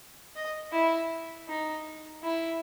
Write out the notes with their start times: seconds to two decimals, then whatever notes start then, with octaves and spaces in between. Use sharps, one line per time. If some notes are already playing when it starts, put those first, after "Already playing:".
0.36 D#5
0.72 E4
1.49 D#4
2.23 E4